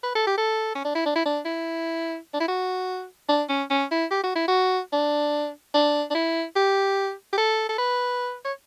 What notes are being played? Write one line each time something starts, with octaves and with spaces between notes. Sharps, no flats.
B4
A4
G4
A4
C#4
D4
E4
D4
E4
D4
E4
D4
E4
F#4
D4
C#4
C#4
E4
G4
F#4
E4
F#4
D4
D4
D4
E4
G4
G4
A4
A4
B4
C#5